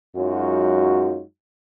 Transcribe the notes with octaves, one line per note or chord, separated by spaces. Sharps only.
F#2 F#3 G#3 D#4 F4 F#4